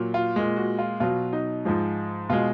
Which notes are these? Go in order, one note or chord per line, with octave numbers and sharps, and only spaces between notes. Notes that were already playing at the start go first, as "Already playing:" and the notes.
Already playing: A#2 F#3
F4
A#2 G#3
F#4
F4
B2 F#3 F4
D#4
G#2 F3 G#3
B2 G#3 F4